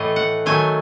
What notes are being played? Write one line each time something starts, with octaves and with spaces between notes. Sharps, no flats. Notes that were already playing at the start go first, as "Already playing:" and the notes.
Already playing: A2 E3 A3 D#5
F#5
D#3 F#3 A3 G#5